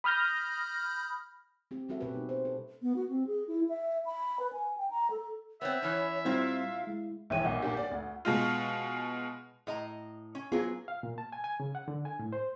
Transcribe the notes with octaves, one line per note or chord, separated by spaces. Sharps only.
B5 D#6 F6 G6 A#6
C4 G4
G3 C4 C#4 F#4 A4 E5
B2 A#3 G4 B4
G3 D#4
G4 C5
A4
B3
F#4
C4
G#4
E4
E5
B5
B4
G#5
G5
A#5
A4
B3 C4 C#5 E5
E3 C#4 C#5
A#2 G3 C4 E4 F4 F5
G#3 E4
A#1 E3 C#5 E5 G5 D#7
B1 A#2 F#5
A#2 D4 G4
D5
D2
B2 G#3 F4
A2 D#5 A#5
C#4
F#3 B3 F4 G#4
F5
A#2
A5
G#5
G#5
C#3
F#5
D3
G#5
A2
C5